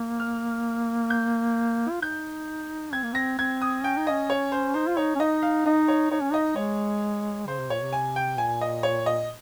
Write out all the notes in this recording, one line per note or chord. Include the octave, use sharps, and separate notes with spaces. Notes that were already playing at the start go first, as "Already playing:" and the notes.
Already playing: A#3
F6
G6
F4
D#4 G6
C4 G#6
A#3
C4 A#6
C4 G#6
D#6
C#4 G5
D#4
C#4 D#5
C#5
C5
D#4 C5
F4
D#4 C#5
C#4
D#4 D#5
F5
D#4 D#5
C#5
D#4 C#5
C#4
D#4 D#5
G#3 C#5
C#3 C5
C3
A#2 C#5
C3
G#5
G5
A#2 G#5
D#5
C#5
D#5